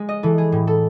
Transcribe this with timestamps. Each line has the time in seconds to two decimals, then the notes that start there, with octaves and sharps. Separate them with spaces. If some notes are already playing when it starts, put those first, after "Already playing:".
Already playing: G#3
0.09 D#5
0.23 E3 A4
0.38 G#4
0.52 A2
0.67 A4